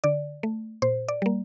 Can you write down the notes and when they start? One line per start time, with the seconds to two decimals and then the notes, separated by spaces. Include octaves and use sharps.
0.04 D3 D5
0.43 A3
0.82 A#2 C5
1.08 D5
1.22 G3 A#3